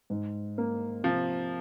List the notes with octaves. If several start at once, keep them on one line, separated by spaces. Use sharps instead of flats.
G#2
A#3
C3 F3